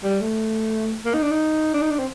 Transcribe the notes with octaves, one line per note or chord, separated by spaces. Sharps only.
G3
A3
A#3
D#4
D4
D#4
D4
D#4
D4
C4